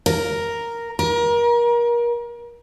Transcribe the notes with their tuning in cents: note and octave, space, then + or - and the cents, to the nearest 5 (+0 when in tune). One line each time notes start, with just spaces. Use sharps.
A#4 +0
A#4 +30